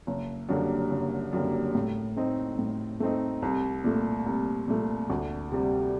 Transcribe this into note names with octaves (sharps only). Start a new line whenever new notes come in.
F#1
F#2 D3 G3 A#3
F#1
F#2 D3 G3 A#3
A2
A3 C4 D#4
A2
A3 C4 D#4
C2
A#2 A3
C2
A#2 A3
D2
C3 G3